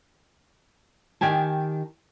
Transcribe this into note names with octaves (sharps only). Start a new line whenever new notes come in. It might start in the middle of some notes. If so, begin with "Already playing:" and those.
D#3 G4 G#5 A5